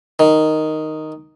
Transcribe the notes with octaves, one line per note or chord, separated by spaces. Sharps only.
D#3